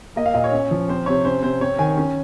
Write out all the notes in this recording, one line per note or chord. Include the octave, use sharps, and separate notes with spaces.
A#3 D#5
F5
A#2 D#5
C#5
C#4
F3
C4 C5
C3 C#5
C#4 C5
C3 C5
C4 C#5
D#3 G#5
C#4